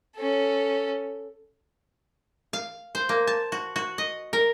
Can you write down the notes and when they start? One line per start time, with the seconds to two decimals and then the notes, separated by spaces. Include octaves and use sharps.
0.17 C#4 A4
2.53 F5
2.95 C5
3.09 A#3
3.27 A5
3.52 F#4
3.76 F#4
3.98 D#5
4.33 A#4